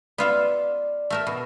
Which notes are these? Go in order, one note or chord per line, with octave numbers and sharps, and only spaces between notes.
B3 F4 D5 E5
A3 A#4 E5
B2